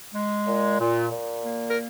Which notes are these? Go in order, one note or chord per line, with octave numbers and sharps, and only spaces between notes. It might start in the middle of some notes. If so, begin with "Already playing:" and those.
G#3
A#2
A#2
A#2
A#3
A#4